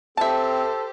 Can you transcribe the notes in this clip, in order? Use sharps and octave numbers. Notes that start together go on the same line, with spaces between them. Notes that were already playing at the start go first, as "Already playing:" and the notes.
C4 G4 A4 C5 E5 A5